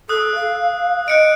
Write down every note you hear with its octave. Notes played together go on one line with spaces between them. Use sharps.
A4 D#6 E6 F#6
F5
D#5 F#6 C#7 D7